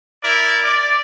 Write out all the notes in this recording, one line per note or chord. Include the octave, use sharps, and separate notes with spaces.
E4 A#4 D5
D5